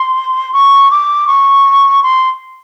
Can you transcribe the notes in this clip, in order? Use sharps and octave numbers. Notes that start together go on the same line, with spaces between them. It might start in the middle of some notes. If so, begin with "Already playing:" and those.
Already playing: C6
C#6
D6
C#6
C6